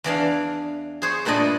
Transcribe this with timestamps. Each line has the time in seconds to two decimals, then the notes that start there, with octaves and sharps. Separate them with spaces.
0.04 E2 E3 D4 F5
1.02 G#4 C5 C#5
1.25 G2 A#2 A3 D4 D#5 B5